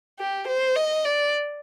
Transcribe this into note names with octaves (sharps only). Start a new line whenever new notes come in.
G4
C5
D#5
D5